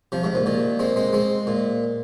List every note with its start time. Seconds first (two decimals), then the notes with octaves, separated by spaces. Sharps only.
0.12 C3 F3
0.23 G#2 C3
0.35 A#2
0.46 A#2 D#3
0.79 G#3 C4
0.96 G#3 C4
1.13 G#3 C4
1.47 A#2